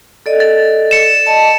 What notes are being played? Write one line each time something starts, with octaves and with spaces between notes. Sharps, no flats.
A4 D5 D#5
A6
C#7 E7
D#5 A5